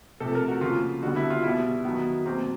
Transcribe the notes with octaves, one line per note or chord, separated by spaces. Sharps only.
C3 F3 A3 A4
A#4
F#4
C#3 F3 A#3 F4
D3 G3 B3 F#4
E4
F4
B2 G3 B3 E4
D#3 F#3 B3
B2 F#3 A#3 C4